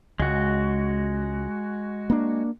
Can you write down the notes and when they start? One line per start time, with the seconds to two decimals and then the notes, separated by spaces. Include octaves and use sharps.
0.20 C#2 G#3 F#4
2.10 A#3 D4